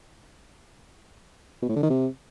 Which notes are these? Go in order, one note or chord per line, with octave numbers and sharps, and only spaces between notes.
B2
A2
D3
D#3
C3